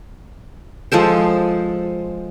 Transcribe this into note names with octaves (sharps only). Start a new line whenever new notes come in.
F3 G#3 A4 C5